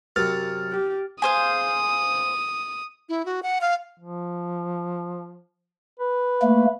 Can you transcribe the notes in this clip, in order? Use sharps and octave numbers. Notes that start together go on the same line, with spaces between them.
F#2 C3 F6 A6
G4
G#4 C5 F5 D#6
E4
F#4
F#5
F5
F3
B4
A3 A#3